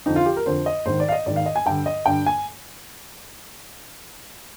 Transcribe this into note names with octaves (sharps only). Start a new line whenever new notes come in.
F2 D3 D#4
F4
G4
A#4
F2 D3 C5
D#5
G#2 D#3 C5
D5
F5
D#5
G#2 D#3 D5
F5
D#5
G#5
G2 D3 G5
D#5
G2 D3 G5
G#5